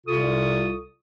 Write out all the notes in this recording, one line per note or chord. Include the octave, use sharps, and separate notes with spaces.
C2 C3 F4 A4 C#6 D#6